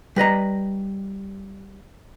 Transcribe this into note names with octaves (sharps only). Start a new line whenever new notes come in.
G3 B4 D#5 A#5